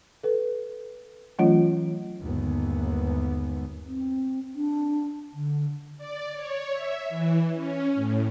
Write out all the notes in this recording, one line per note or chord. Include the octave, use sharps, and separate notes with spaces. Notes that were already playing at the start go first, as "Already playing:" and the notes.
A4 B4
E3 F#3 A3 C#4 F4
G1 D#2 G#3 B3
C4
D4
D3
D5
C#5
E5
E3
C#4
A2